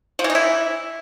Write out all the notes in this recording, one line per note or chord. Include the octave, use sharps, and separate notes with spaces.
F3
E3
D#4
E4